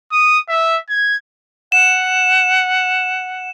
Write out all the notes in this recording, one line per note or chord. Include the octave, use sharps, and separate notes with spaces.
D#6
E5
G#6
F#5 E7